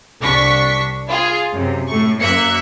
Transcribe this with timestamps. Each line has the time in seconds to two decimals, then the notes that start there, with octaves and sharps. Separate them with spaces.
0.20 C2 D4 C#6 B6
1.09 F4 G#4
1.53 F#2 C3
1.88 A2 A3 C#6
2.20 F#2 A#3 E5 F#6 C#7